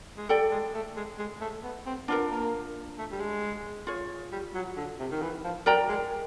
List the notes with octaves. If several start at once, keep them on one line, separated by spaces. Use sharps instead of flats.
G#3
G3 A4 D5 G5
G#3
A3
G#3
G#3
A3
B3
C4
B3 D4 F4 A#4
A#3
A3
G3
G#3
F4 G#4 C#5
G3
F#3
D3
C3
D#3
E3
F3
F#3 A#4 D5 G5 A#5
G#3